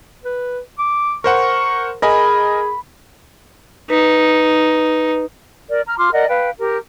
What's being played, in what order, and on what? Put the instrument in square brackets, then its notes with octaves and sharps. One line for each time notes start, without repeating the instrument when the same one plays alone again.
[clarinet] B4
D6
[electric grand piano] A#4 C5 F#5 [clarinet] C#6
[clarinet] G#4 [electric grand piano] A#4 D#5 G#5 [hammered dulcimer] B5
[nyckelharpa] D#4 [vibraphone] B4
[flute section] A#4 D5
A#5 F6
F4 C6 D6 F6
A#4 D5 D#5 F#5
B4 F5 G5
G4 A#4